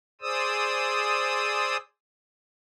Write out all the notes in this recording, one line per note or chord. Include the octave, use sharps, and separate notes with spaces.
G#4 C5 D5 D#6 E6